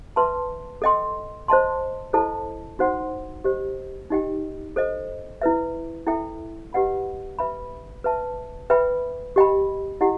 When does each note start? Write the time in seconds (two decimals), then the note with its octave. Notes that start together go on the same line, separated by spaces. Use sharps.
0.16 B4 E5 A5 C6
0.82 A4 D#5 G5 C6
1.48 C5 D#5 A5 C6
2.13 E4 A4 C5 D#5 A5
2.79 D#4 F#4 C5 F#5 C6
3.44 G4 C5 D#5
4.10 D#4 G4 D#5 G5
4.76 A4 C5 D#5
5.42 E4 B4 E5
6.07 E4 A4 E5 G5
6.73 G4 B4 D#5 F#5 B5
7.39 B4 E5 B5
8.04 B4 E5 A5
8.70 B4 E5 G5 B5
9.36 G4 D#5 G5 B5
10.01 E4 G4 D#5 F#5